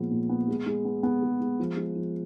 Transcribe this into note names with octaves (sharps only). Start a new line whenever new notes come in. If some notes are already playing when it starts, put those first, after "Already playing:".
Already playing: A#2 F3 G#3 B3
A#2
B3
G#3
G#3
B3
B3
G#3
G#3
F3
G#3
F3